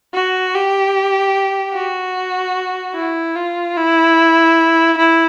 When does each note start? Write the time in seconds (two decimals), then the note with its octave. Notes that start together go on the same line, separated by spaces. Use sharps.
0.14 F#4
0.55 G4
1.74 F#4
2.95 E4
3.36 F4
3.77 E4
4.98 E4